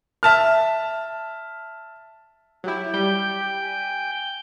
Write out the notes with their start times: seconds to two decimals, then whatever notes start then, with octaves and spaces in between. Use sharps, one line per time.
0.23 E5 A5 F6
2.64 F#3 E4 G4
2.94 G3 G5 G6
3.61 G#5